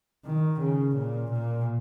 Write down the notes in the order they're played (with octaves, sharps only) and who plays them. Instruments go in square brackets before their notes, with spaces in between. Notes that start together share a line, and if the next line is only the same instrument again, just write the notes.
[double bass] D#3
C#3
A#2
A#2